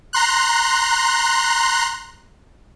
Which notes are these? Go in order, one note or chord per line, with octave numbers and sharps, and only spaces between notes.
A#5 C6 F#6